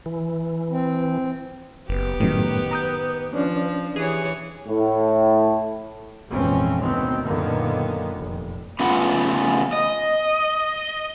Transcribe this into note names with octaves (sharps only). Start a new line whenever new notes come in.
E3
C4
F#1 B3 G4 B4
F#2 A2 D#3
A#5 D#6 G6
F3 C#4 D4 D5
E3 G4 G#4 C#5
A2
G#1 F2 A#2 E3 C4 C#4
D2 B2 D#3 B3 C4
F#2 A#2 D3 D#3 A#3 B3
F1
C#3 A3 B3 F4 B4 F#5
D#5